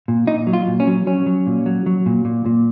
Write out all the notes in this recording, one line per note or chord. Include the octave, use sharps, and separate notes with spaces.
A#2
A#2 D#4
F#3
F4
A#2
C#4
F#3
F#3 C#4
F#3
A#2
F#3
F#3
A#2
A#2
A#2